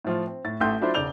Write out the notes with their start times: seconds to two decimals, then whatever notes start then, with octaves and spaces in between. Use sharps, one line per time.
0.05 A2 F3 F4
0.27 C4
0.45 A2 A6
0.60 A1 A3 G5 C6 G6
0.81 F#3 D4 E4 F4 C5
0.94 E1 C#3 D5 G6 F7 G7